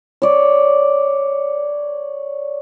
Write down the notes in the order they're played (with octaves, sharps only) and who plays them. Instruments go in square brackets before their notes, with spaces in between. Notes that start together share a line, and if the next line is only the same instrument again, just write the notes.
[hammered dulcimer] C#5 D5